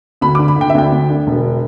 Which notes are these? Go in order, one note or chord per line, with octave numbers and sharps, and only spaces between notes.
D2 B5
D6
D3
B5
D3 G5
E5
D2 G5
D2
D3
E1